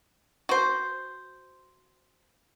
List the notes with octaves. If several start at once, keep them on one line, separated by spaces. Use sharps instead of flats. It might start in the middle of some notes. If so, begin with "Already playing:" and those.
F#4 C5